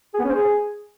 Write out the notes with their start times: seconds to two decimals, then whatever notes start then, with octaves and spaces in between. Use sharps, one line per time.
0.14 G#4
0.19 B3
0.24 C#4
0.29 C5
0.34 G#4